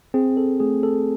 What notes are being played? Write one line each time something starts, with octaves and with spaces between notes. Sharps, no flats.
C4 G#4
A4
A3 G#4
A4